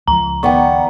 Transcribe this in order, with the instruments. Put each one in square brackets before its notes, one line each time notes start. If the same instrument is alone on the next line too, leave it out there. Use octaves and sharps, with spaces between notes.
[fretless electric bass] C#2 F3 [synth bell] A#5
[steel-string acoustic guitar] D#3 B3 D5 [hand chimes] G5 C#6